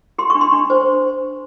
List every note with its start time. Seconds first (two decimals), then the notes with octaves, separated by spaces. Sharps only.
0.18 G4 C6
0.30 C#6
0.35 D4
0.41 C6
0.52 D4
0.70 C5